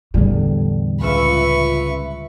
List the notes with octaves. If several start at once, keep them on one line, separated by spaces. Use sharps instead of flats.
E2 A2 D3 G3
C#2 F4 B4 E5 C#6